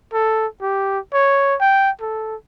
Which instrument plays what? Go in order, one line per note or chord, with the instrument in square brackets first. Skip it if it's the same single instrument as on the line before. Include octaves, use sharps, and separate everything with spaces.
[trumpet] A4
G4
C#5
G5
A4